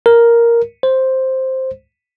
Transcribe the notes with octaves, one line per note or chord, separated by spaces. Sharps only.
A#4
C5